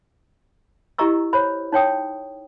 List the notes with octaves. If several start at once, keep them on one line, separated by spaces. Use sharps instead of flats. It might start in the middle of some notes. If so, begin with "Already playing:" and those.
E4 G4 D#5 A#5 C#6 E6
C5 C#5 B5
D#4 C#5 G5 D#6